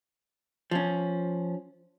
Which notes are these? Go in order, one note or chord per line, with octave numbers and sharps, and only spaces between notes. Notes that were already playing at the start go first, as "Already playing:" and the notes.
F3 C#4